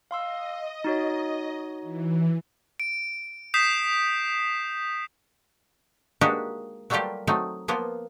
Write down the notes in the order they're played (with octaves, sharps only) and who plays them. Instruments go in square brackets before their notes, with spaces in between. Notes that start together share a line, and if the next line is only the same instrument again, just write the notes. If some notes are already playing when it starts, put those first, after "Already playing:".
[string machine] D#5 [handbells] F5 C6 E6
[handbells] D#4 F#4 C#5
[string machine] E3
[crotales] D7
D#6 G6 B6 C7 E7
[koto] G#3 A#3 D4 D#4 F#4 G4
F#3 G3 A3 A#3 F4 G4
F#3 A3 C4 D#4
F3 A#3 B3 F4